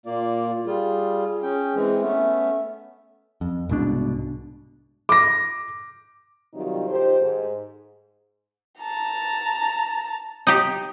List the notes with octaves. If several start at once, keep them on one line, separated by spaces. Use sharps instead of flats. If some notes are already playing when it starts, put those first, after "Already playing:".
A#2 A#3 F4 D5
G3 F4 G#4
C#4 G5
E3 G#3 C4
A3 B3 C#4 E5
F2
C2 G#2 B2 D4
D6 A#6
C3 D#3 F#3 G3 D#4 F4
D#3 G4 A4 C5
G#2
A5 A#5
D#4 G4